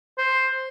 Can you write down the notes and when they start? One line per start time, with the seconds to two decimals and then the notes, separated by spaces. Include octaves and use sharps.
0.18 C5